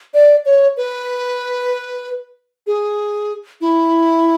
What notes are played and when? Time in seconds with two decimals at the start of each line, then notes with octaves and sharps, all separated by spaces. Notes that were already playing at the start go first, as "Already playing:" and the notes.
0.14 D5
0.46 C#5
0.77 B4
2.67 G#4
3.61 E4